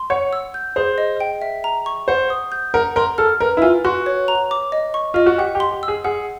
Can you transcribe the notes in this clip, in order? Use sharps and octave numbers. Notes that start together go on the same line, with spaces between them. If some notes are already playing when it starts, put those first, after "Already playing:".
Already playing: C6
C#5 F#5
E6
G6
G#4 C5
D#5
G5
E5
A#5
C#6
C5 F#5
D#6
G6
A#4 F#5
A#4 C6
A4 F6
A#4 B4
E4
F4 G#5
F#4 C6
C#5
A#5
D6
D#5
C#6
F4 D#5
F#4
G4 F#5
G4
C6
G4
E6
G#4
G#4 F#5